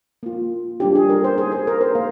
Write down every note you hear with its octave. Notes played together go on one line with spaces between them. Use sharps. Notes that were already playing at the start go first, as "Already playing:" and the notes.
A#3 F4
G3 A#3 D4 F4 G4
G#4
A#4
C5
A#3 D#4 G4 G#4
G#4
A#4
C5
A#3 F5